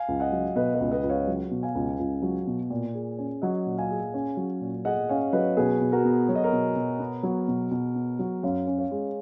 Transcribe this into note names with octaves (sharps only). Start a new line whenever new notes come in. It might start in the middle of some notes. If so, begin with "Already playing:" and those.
Already playing: F5 G#5
C#2
D#5 F#5
F#3
B2 B4 D#5
B4 D#5
C#2
B4 D#5
C#2
C#5 F5
F#3
B2
F5 G#5
C#2
C#2
F#3
B2
A#2
G#4
C#4
F#3 D#5 F#5
A#2
F5 G#5
G#4
C#4
F#3
A#2
G#4 D#5 F#5
C#4 C#5 F5
F#3 B4 D#5
B2 G#4 B4
B2
F#4 A#4
B3
F#3 C#5
D#5
A#4 C#5
B2
B2
B3
F#3
B2
B2
B3
F#3
F#2 C#5 F5
C#4
C#5 F5
G#3